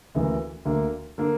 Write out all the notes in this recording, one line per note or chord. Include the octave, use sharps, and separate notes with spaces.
D2 C#3 E3 A#3
D2 D3 A#3
D3 A#3